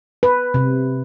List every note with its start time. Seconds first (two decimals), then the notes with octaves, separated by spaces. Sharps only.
0.23 B4
0.54 C3